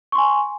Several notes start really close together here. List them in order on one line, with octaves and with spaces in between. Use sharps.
C#6 C6 G#5